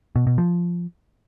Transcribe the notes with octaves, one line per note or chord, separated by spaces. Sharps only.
B2
B2
F3